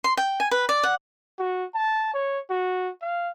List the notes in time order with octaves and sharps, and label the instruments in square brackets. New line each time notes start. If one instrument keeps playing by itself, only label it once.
[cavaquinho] C6
G5
G#5
B4
D5
F#5
[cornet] F#4
A5
C#5
F#4
F5